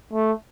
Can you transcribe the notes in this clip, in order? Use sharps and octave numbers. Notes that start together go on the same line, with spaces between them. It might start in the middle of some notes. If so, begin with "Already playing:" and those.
A3